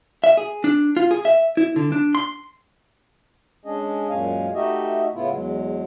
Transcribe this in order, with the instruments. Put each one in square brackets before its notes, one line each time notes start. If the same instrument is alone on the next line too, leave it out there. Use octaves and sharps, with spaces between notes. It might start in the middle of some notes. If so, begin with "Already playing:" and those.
[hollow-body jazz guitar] E5
G#4
D4
F4
G#4
E5
E4
D3
D4
C6
[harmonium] G#3 C#4 D4 G#4 D#5
F#2 A#2 G#3 C#4 F5 G#5
A3 D#4 F#4 G4 D#5 E5
A2 C#3 B3 E4 F4
E2 F#3 G#3